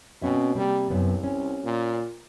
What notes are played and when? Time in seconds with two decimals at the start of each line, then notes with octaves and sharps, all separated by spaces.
0.22 B2 C4 C#4 E5
0.55 C3 G3 A#3
0.90 C2 F#2 C3 B3
1.24 C#4
1.64 A#2